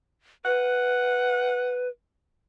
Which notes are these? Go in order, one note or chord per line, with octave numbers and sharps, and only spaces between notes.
B4 F#5